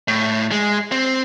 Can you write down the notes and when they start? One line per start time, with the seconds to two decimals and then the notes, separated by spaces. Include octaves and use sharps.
0.08 A2
0.51 G#3
0.92 C4